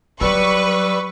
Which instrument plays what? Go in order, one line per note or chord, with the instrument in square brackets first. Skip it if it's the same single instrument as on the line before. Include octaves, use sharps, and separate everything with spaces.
[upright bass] F#3 [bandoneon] G3 E6 [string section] B4 C#6